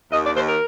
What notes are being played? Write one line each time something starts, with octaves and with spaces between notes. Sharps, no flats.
D#2 D#5
D5
D#2 C5
A#4